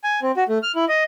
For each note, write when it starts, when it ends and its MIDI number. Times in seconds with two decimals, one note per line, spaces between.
0.04 0.20 80
0.22 0.32 60
0.37 0.44 66
0.49 0.58 57
0.63 0.72 89
0.75 0.85 64
0.88 1.04 75